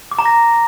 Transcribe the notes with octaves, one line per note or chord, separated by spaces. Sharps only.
D6
A#5
A#6